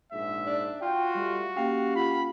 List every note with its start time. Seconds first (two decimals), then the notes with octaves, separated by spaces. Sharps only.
0.13 A#1 G#2 E5
0.46 D4
0.82 F4 F#4 G5
1.15 G3 A3
1.57 A#3 C#4 G4 F5 G5
1.96 F4 F#5 B5